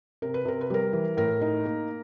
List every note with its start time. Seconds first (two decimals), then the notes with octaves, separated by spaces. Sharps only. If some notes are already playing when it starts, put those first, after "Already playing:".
0.22 C3 A#4
0.34 B4
0.45 C3 A#4
0.61 B4
0.70 G3 A#4
0.93 E3
1.17 A2 A#4
1.41 D#4
1.66 A#3